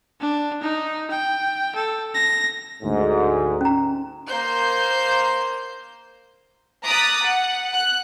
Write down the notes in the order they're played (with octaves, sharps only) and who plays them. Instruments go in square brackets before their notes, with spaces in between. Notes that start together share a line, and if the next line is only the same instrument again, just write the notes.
[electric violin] D4
D#4
G5
A4
A#6
[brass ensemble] D2 G#2
[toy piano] C#4 A#5
[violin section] A#3 C5 G6
[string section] A#5 D6 D#6 F#6 A6 B6
F#5
F#6